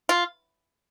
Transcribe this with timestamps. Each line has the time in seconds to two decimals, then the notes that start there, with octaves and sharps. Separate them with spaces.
0.09 F4